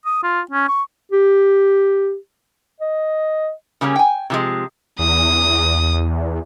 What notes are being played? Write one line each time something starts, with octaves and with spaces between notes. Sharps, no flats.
D#6
F4
C#4
C#6
G4
D#5
C#3 G3 A#3 C#4
G5 G#5
C3 F3 G#3
E2 D#6